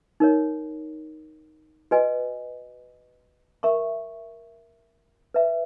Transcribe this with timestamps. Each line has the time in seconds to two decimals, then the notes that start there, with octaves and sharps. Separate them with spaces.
0.20 D#4 A#4 C#5
1.91 F#4 B4 D#5 G#5
3.63 A#4 E5 A#5 C#6
5.34 B4 E5 A#5